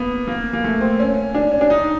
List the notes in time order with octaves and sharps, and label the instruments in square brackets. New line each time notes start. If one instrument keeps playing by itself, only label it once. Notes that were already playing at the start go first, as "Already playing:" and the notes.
Already playing: [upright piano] A#3 B3
A#3
A#3
A3
C4
C#4
D4
C#4
D4
D#4